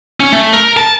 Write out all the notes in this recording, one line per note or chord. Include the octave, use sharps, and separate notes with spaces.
C#4
A3
A#4
A5